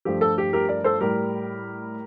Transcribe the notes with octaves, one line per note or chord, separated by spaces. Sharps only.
G2 F3 A3 G4
A4
G4
G4 A#4
A#4 D5
A4 C5
A2 G3 G4 A#4